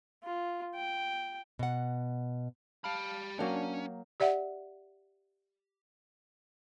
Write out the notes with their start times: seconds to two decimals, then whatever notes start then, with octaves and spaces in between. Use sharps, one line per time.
0.23 F4
0.75 G5
1.59 B2 F#5
2.84 G4 F5 A5 B5 F6
3.39 F#3 A#3 C#4 D4 G5
4.20 G4 D5 E5 F#5